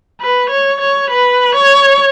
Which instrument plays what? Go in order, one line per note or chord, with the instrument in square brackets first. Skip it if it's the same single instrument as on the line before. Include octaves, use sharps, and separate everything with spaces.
[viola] B4
C#5
C#5
B4
C#5